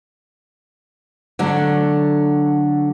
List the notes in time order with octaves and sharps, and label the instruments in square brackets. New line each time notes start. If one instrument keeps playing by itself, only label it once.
[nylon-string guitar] D3 F#3 A3 D4